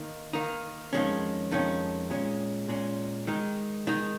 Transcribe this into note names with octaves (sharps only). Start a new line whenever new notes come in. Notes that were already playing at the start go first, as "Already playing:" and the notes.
Already playing: D#3 A#3 D#4
D#3 A#3 D#4
F2 D#3 G#3 C#4
F2 D#3 G#3 C#4
A#2 G#3 C#4
A#2 G#3 C#4
D#3 G#3 D#4
D#3 G#3 D#4